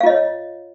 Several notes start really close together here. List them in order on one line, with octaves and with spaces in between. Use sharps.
F5 F4 D#5 C#5